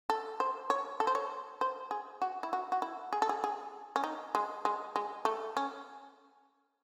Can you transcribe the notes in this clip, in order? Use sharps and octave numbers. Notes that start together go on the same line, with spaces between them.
A4
C5
C#5
A4
C5
C#5
C5
G#4
F#4
E4
F#4
F#4
E4
G#4
A4
G#4
G#4
C#4
D#4
G#3
G#3
G#3
A3
C#4